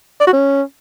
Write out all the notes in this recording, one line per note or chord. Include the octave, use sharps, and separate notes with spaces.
D5
F#4
C#4